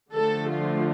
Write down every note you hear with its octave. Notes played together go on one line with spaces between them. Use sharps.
D3 F3 A3 A4
F4